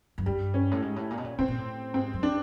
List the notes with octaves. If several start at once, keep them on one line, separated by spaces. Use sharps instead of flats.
F#2
G2 G3
C#4
A2
G#2
A2
A#2
B2
A#2
A2 C4
A#2
A2
G#2 C4
F#2
D4